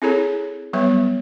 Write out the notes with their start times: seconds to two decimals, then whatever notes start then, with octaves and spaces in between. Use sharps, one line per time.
0.02 C4 E4 G#4 A4 C#5 A#5
0.73 F#3 G3 B3 B4 C#5 E5